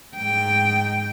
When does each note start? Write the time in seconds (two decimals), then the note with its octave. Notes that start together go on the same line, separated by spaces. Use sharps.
0.17 G#2 G5